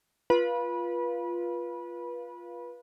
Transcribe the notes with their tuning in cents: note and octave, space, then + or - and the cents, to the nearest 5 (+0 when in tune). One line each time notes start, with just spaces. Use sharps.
F4 -5 B4 -25